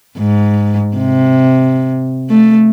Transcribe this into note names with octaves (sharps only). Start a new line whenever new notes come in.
G#2
C3
A3